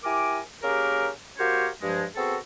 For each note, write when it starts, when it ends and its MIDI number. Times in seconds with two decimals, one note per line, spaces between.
0.03 0.40 64
0.03 0.40 67
0.03 0.40 70
0.03 0.40 80
0.03 0.40 86
0.63 1.09 58
0.63 1.09 61
0.63 1.09 67
0.63 1.09 68
0.63 1.09 70
1.39 1.68 58
1.39 1.68 66
1.39 1.68 67
1.39 1.68 70
1.39 1.68 72
1.39 1.68 73
1.82 2.04 43
1.82 2.04 53
1.82 2.04 56
2.16 2.36 59
2.16 2.36 60
2.16 2.36 66
2.16 2.36 68
2.16 2.36 69